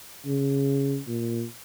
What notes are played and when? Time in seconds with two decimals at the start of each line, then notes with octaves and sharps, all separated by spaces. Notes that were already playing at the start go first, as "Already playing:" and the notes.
0.26 C#3
1.07 A#2